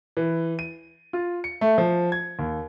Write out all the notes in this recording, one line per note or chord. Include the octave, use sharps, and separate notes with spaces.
E3
D#7
F4
C#7
A3
F3
G#6
D#2